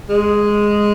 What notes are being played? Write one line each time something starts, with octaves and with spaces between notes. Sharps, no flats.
G#3